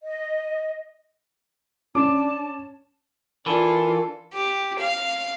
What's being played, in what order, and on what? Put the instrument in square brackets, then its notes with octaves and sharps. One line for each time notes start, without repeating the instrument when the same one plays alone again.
[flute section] D#5
[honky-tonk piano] C#4 D6 D7 [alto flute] D4 [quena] A5
[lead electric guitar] E3 [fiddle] D4 F4 [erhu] A4 [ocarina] A#4
[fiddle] G4
F5